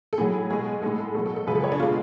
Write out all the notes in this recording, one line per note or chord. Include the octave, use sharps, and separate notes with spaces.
A4
A2 F#3 G#4
B2 G#3 G#4
A2 G#3 A4
A4
B2 F#3 A4
A4
A4
F#2 C#3 F3 G#3 B4
A4
C#5
D4
B2 G#3 F4